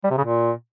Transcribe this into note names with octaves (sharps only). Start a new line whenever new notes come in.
G3
C3
C#3
A#2